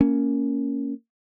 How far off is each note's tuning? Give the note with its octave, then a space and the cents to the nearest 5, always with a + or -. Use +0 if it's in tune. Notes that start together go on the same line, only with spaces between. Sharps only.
A#3 -10 C#4 +0